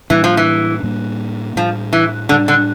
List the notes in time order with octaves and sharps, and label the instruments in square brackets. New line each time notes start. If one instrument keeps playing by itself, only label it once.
[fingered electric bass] A2 G3 A#3 D4 [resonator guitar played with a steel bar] E3
[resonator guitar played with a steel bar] F3
E3
[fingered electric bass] A2 G3 A#3 D4
[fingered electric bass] A2 G3 D4 [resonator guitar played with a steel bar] F3
[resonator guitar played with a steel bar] E3
[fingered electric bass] A2 G3 D4 [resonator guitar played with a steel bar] D3
[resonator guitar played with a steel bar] D3